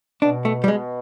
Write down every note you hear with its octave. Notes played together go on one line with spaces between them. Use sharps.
B2 D4
A3
G3
B2 G#3